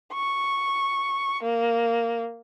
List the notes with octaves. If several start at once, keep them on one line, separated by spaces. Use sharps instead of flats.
C#6
A#3